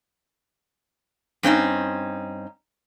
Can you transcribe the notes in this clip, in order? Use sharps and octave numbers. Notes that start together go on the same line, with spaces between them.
G2 C4 C#4 D#4